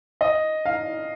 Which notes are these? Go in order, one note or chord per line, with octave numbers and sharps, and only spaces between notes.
D#5
F5